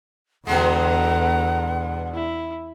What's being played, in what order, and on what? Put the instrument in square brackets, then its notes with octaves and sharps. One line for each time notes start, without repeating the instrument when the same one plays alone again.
[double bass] E2 [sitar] B2 D3 G#3 [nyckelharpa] A4 A#5 [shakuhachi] F#5
[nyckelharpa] E4